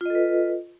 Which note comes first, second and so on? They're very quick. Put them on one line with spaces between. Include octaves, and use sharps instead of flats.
F4 D#5 A4 B4